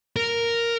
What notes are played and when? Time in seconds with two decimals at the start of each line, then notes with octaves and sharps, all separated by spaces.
0.16 A#4